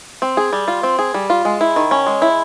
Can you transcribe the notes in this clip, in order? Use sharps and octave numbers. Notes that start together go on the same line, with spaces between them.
C4
G#4
G3
F4
C4
G#4
G3
F4
G#3
E4
D#3
C#4
G#3
E4